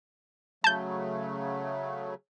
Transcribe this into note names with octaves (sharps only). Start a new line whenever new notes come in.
C#3 F#3 A3 A5 G6